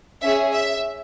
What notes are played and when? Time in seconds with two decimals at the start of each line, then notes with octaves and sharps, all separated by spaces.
0.21 C#4 G#4 E5
0.53 E5